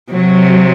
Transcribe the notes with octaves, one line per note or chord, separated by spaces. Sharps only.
C3 F#3